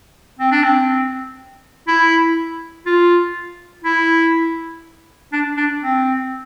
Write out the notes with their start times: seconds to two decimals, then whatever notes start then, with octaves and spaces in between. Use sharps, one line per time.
0.39 C4
0.51 D4
0.63 C4
1.87 E4
2.86 F4
3.84 E4
5.33 D4
5.57 D4
5.82 C4